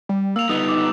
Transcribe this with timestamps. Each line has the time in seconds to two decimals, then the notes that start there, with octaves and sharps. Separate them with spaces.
0.09 G3
0.36 A#3 E6 F7
0.49 G3 B3 D#4 D#6
0.68 D6